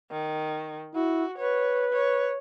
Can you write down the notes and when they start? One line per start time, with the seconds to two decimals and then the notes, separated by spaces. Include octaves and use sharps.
0.11 D#3
0.95 E4 F#4
1.38 B4 C#5
1.92 C#5